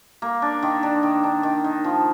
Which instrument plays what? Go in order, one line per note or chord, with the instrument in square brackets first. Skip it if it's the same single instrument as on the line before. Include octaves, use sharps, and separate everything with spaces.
[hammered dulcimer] A#3
D4
D#3
D4
D#3
D4
D#3
D#3
F3